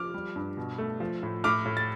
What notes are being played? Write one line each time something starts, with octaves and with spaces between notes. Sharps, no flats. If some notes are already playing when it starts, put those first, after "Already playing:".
Already playing: F3 D6 F6
G3
G2
B2
A3
F3
A2
A2 D6 F6
A2
A6